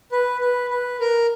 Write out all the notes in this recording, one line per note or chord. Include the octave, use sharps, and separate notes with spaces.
B4
B4
B4
A#4